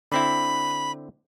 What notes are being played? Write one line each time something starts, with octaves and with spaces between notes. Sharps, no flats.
D3 C4 E4 B5